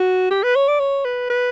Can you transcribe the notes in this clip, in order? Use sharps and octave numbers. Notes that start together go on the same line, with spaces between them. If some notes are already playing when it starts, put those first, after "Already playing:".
Already playing: F#4
G4
B4
C#5
D5
C#5
B4
B4